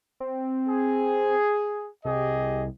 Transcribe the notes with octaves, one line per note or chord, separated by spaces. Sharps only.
C4
G#4
C2 G4 G#4 D#5